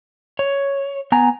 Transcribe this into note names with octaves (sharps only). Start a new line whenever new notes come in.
C#5
B3 G#5 A#5